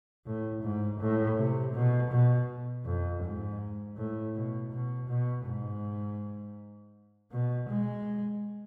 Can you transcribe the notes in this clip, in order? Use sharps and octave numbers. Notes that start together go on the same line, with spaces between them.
A2
G#2
A2
C3
B2
B2
F2
G#2
A2
B2
B2
B2
G#2
B2
G#3